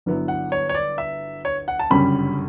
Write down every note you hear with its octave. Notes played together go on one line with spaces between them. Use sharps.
G1 G2 F#3 B3 E4
F#5
C#5
C#5
D5
E5
C#5
F#5
A5
G1 F#2 C#3 G3 C#4 B5